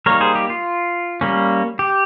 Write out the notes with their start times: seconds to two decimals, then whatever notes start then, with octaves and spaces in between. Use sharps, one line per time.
0.06 G3 A#3 D#4 A#4 C#5
0.21 G#4 C5
0.35 G4
0.50 F4
1.21 G3 A#3 C#4
1.79 G4